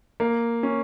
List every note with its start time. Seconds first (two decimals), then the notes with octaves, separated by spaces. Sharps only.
0.20 A#3
0.63 C#4